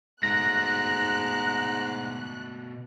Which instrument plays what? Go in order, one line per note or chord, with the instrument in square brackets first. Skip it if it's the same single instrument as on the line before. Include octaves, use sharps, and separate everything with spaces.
[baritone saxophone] G#2 [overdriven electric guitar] B2 A3 [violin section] F#6 [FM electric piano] A#6